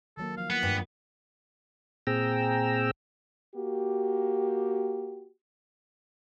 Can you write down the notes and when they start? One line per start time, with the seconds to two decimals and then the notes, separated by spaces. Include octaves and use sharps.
0.17 D#3 F#3 A#3 A4
0.37 F3 F5
0.50 A#3 B3 E4 F4 F#5
0.63 G2 D#3
2.07 A#2 C4 G#4 G5 A#5 E6
3.55 A#3 F#4 G4